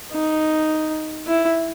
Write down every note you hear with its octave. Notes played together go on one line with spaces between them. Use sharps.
D#4
E4